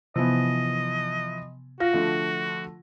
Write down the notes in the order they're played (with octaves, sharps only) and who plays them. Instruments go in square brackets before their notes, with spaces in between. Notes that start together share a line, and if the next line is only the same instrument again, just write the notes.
[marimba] C3 B3 [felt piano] E3 F3 [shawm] D#5
[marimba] F4 F5 [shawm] F#4 [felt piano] A#6
[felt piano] D3 F3 A3